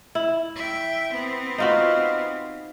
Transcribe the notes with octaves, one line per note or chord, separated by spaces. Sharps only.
E4
E5 G5
B3 C4
D#4 F4 F#4